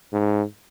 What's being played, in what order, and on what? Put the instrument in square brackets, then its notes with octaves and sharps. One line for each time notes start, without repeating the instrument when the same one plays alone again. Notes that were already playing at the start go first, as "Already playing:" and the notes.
[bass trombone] G#2